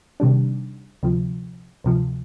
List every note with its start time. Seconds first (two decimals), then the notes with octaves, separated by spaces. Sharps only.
0.20 C3 D#3 G3 D4
1.03 D2 C3 F3
1.84 D2 C3 F3